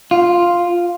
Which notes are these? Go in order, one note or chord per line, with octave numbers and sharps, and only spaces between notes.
F4